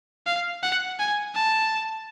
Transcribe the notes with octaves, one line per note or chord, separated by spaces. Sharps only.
F5
F#5
G#5
A5